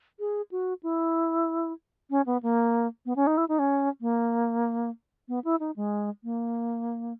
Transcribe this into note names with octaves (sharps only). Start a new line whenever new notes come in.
G#4
F#4
E4
C#4
B3
A#3
B3
C#4
D#4
E4
D#4
C#4
A#3
B3
E4
D#4
G#3
A#3